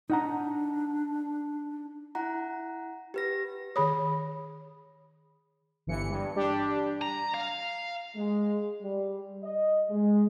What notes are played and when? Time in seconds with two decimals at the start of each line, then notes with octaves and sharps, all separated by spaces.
0.10 D4 D#4 F#5 A#5
2.15 E4 F#5 A#5
3.14 G4 B4 A#6
3.76 D#3 G#4 C#5 B5 D#6
5.87 G1 E3 C#7
6.10 G2
6.36 G3 D4 G4
7.02 A#5
7.34 F5
8.16 G#3
8.82 G3
9.44 D#5
9.91 G#3